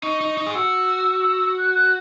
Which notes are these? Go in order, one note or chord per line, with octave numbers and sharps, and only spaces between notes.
D#4 C#6
D#4
D#4
G#4
F#4 E6
F#6
F#6